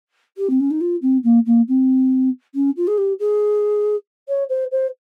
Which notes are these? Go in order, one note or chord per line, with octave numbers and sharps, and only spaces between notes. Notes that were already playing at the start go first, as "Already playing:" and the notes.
G4
C4
C#4
D#4
F4
C4
A#3
A#3
C4
C#4
F4
G#4
G4
G#4
C#5
C5
C5